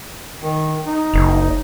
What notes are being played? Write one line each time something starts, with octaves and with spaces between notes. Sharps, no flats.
D#3
D#4
F#1